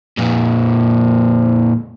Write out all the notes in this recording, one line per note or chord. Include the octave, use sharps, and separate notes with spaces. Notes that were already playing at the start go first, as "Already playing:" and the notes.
F2 A#2